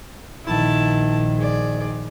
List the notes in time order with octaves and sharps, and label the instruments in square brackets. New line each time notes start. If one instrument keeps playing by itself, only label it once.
[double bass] A#1 D#3 [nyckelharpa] E4 A5
[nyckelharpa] G#4 D5